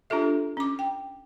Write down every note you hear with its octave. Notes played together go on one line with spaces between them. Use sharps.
D4 F4 G4 A4 E5
C#4 D6
G5